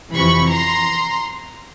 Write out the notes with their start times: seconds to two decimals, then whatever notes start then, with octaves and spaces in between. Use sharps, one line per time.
0.14 F2 C3 E3 B5 C#6
0.50 A#5 C6